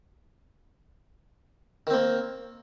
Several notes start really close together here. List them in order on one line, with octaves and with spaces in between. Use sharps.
D#3 C4 A#3